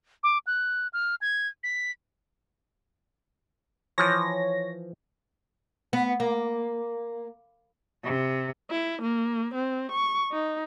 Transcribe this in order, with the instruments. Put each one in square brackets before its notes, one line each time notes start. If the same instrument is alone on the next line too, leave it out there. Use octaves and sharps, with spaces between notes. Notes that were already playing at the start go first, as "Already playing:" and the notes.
[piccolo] D6
F#6
F6
G#6
B6
[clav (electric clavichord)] E3 F3 [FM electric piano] C#5 A#6
[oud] B3
A#3
[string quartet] C3
[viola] E4
A#3
C4
C#6
D#4